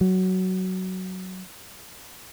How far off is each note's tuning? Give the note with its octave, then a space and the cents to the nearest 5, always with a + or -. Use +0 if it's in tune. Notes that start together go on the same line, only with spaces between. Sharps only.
F#3 +10